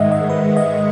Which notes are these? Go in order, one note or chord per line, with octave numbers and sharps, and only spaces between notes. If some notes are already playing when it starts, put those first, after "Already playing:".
Already playing: G#2 D#3 G#3 D#5 E5 F#5
D#5
B4
D#5